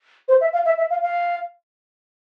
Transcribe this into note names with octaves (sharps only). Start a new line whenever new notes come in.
C5
E5
F5
E5
E5
F5
F5